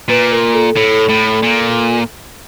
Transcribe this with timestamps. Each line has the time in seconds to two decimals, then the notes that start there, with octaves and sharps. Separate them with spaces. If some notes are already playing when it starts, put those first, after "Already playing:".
0.09 A#2 B4
0.32 A#4
0.54 A4
0.76 A2 A4
1.09 A2
1.43 A#2